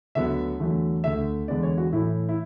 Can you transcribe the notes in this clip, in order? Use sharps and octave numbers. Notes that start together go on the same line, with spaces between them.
D2 D3 F#3 B3 E5
E2 D3 F#3 A3
D2 D3 A3 E5
E2 D3 G#3 B3 D5
C#5
F#4
A2 E3 A3 E4
E4